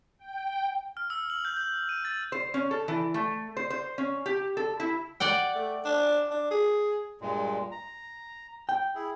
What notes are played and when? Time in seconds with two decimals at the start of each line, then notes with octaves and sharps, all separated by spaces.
0.18 G5
0.97 F6
1.10 E6
1.30 F#7
1.45 G6
1.57 G6
1.89 D#7
2.05 A6
2.32 C5
2.54 C#4
2.71 A4
2.88 E3
3.14 A3
3.57 C5
3.70 C5
3.98 C#4
4.26 G4
4.57 A4
4.80 E4
5.20 D5 F#5 G5
5.55 A3
5.85 D4
6.31 D4
6.51 G#4
7.21 G2 A#2 G#3
7.71 A#5
8.69 G5
8.95 E4 G#4